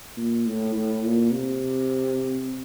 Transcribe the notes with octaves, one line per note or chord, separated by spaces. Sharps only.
A#2
A2
A2
A#2
C3